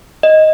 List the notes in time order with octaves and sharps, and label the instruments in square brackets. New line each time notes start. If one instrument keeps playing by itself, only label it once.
[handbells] D#5